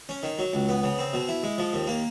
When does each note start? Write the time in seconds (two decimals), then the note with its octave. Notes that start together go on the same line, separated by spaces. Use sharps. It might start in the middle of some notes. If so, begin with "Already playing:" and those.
0.09 C#4
0.23 D#3
0.39 F#3
0.53 C#2
0.69 B3
0.84 C#3
0.98 C4
1.13 B2
1.29 E4
1.43 G#3
1.58 F3
1.73 D#2
1.88 A#3